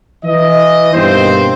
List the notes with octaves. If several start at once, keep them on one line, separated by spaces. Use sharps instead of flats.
E3 D#5
G2 B2 D#3 A#3 C4 C5